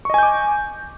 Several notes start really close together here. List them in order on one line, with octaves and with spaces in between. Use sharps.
C#6 D#5 G#5 G6 D6